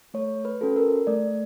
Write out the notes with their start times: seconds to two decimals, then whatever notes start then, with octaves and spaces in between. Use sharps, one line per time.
0.14 A3 C#5
0.45 B4
0.61 C#4 F#4 A4
0.76 A#4
1.07 A3 D5